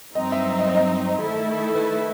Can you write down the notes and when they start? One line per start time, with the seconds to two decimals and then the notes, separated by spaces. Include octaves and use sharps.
0.15 G2 F#3 C4 D#4 D#5
0.32 E5
0.51 E5
0.59 D#5
0.68 C5
0.75 D#5
1.21 D#3 A3 E4 A4
1.74 B4